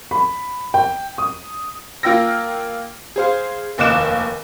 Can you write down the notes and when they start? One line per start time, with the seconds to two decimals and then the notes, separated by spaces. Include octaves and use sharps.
0.11 B5
0.74 G5
1.18 D#6
2.03 A#3 F4 G5 E6 A#6
3.16 G#4 C5 F5
3.78 F1 D#2 D#5 D6 F#6 E7